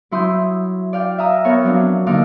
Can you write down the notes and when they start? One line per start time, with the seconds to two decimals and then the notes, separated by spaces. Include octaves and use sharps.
0.11 F#3 E4 C6 D#6 G6
0.93 D5 F5 G5
1.18 E5 F5 A#5 D#6
1.44 B3 A#4 C#5 F5
1.64 F3 F#3 C4 D4
2.07 D3 F3 A#3 D#4 F5 D6